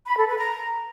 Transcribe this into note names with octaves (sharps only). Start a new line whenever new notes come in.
B5
A4
B4
A#5